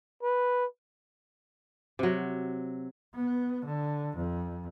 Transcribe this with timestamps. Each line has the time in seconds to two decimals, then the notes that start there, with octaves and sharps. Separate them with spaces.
0.23 B4
1.99 C3 F#3
3.15 B3
3.65 D3
4.17 F2